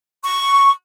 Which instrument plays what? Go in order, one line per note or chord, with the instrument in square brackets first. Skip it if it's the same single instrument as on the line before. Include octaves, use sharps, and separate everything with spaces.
[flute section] C#6